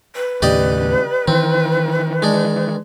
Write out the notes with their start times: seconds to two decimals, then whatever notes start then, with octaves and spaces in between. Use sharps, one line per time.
0.15 B4
0.42 D#2 A2 C#3 G4 D5 D#5
1.28 D#3 E3 C4
2.22 G#3 D4